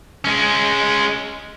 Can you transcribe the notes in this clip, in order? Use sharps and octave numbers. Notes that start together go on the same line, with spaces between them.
G#3 C#4